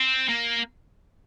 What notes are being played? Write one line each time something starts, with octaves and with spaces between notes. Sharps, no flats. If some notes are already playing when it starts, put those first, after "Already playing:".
Already playing: C4
A#3